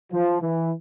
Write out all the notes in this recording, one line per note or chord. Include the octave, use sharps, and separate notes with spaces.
F3
E3